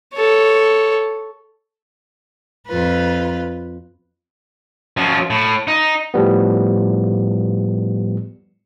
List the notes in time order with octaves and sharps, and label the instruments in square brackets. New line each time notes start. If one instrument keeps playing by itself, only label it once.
[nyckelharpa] A4 C#5
[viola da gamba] F2 F4 B4
[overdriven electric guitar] F#2 F3
A2
D#4
[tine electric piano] A2 F3 G3 B3